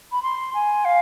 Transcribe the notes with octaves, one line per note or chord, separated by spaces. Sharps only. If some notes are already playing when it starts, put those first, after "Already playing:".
B5
C6
G#5
F5